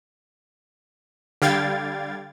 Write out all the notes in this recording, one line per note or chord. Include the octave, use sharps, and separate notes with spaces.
D3 G3 F5 G5 G#6 A6